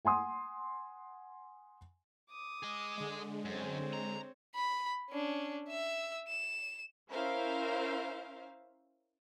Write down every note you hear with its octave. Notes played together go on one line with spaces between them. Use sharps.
F#5 G#5 C6 D#6
D6 D#6
G#4 D#5
D3 G#3
F#2 C4 C#5
A#5
B5
C#4 D4
E5 E6
E7
C#4 E4 A#4 C5 E5 F5